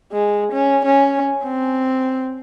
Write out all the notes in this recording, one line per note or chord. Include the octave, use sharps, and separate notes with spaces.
G#3
C#4
C#4
C4